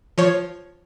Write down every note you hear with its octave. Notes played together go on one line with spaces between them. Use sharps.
F3 C#5